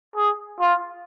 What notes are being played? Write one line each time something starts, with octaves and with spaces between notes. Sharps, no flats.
G#4
F4